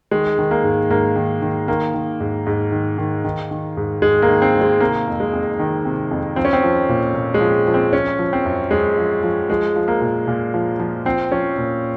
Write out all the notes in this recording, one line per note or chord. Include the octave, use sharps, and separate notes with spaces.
D#3 G#3
D#3
A#3
G#2
G#2 A#3
D#3
D#3
D#3 A#3
D#3
G#2
G#2
D#3
D#3
D#3
D#3
G#2
G#2 G#3
A#3
D#3
C4
D#3
G#3
C3 A#3
F2
G#3
F2
D#3
C3
F2
F3 C4
C#4
C4
F3
A#2
A#2
G#3
F3
F3
C4
F3 C#4
F3
C4
F#2
F#2 G#3
F3
F3
F3 G#3
F3
A#3
A#2
A#2
F3
F3
F3 C4
F3 C#4
A#2